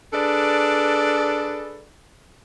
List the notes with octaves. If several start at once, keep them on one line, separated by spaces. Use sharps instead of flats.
D4 G#4 A4 B4 D5